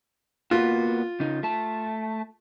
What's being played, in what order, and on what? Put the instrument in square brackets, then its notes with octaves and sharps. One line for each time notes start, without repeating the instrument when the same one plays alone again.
[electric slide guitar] A#3 B3 F#4 [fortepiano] F4
[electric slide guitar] C#3 D#4
A3 A5